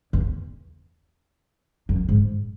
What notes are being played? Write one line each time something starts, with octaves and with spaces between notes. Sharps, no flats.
E2
F#2
G#2